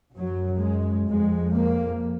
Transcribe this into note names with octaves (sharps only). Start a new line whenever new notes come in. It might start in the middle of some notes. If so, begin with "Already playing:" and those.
F#2 F#3
G#3
F2 G#3
A#3